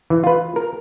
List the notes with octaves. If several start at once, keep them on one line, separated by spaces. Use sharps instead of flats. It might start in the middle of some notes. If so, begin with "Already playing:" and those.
E3
F4 B4
A#4